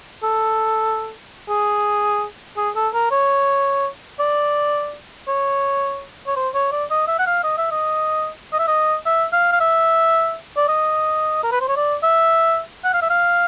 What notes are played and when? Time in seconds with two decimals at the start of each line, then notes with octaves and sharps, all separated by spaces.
0.23 A4
1.49 G#4
2.57 G#4
2.76 A4
2.94 A#4
3.11 C#5
4.20 D5
5.28 C#5
6.27 C#5
6.36 C5
6.54 C#5
6.72 D5
6.90 D#5
7.08 E5
7.19 F#5
7.27 F5
7.44 D#5
7.58 E5
7.71 D#5
8.53 D#5
8.60 E5
8.68 D#5
9.06 E5
9.33 F5
9.52 F5
9.60 E5
10.57 D5
10.68 D#5
11.44 A#4
11.52 B4
11.61 C5
11.68 C#5
11.77 D5
12.03 E5
12.84 F#5
12.94 F5
13.02 E5
13.10 F5